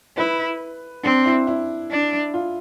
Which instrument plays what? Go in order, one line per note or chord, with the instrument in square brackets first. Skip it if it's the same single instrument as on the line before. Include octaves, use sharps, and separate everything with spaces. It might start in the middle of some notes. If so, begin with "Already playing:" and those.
[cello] E4 [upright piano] B4
[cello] C4 [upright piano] D4
[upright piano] E4
E4
[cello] D4
[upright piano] F4